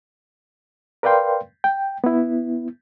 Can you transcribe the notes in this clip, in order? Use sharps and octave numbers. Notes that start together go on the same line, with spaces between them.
A#4 B4 D5 F5 G5 C6
G5
B3 E4